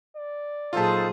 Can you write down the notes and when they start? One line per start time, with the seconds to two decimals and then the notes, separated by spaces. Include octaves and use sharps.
0.16 D5
0.73 A#2 F#3 D#4 F4 G#4 A4 C5 A5